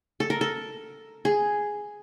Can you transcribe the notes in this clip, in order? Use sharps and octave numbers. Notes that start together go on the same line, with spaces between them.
A4
A#4
A4
G#4